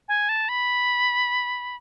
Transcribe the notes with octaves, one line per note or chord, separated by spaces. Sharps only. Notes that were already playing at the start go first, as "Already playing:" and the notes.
G#5
A5
B5